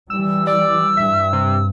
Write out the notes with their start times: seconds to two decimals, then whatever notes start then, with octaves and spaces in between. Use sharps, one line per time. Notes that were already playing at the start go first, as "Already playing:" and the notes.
0.10 E3 G3 E6
0.47 D5 E6
0.97 G2 E5
1.33 C3